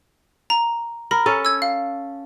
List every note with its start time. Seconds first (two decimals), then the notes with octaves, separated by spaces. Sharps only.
0.50 A#5
1.11 A#4 B5
1.26 C#4 A4
1.45 E6 G#6
1.62 F5